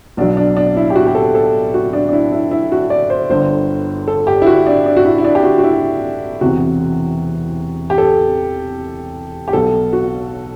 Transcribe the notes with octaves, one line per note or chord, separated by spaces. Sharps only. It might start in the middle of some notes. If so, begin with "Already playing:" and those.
B1 B2 F#3 D4
D4
D4
E4
G4
F#4
G4
A4
A4
F#4
D4
D4
E4
E4
E4
F#4
D5
C5
G1 G2 D3 C5
A4
G4
E4
F#4
D4
D4
F#4
E4
E4
D4
G4
F#4
F#4
E4
E1 E2 C3 F#4
G4
A4
G4
B1 B2 F#3 A4
F#4